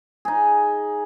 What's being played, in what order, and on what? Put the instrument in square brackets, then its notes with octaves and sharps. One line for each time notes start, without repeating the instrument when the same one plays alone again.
[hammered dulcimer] D#4 G#4